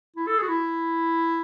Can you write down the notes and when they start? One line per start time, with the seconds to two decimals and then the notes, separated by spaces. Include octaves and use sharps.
0.16 E4
0.27 A4
0.38 G#4
0.42 F#4
0.49 E4